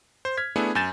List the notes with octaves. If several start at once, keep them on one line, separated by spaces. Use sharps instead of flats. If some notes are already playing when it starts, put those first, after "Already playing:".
C5
F6 G#6 B6
A3 B3 D4 E4 G#4
F#2 G#5 G6 A6 E7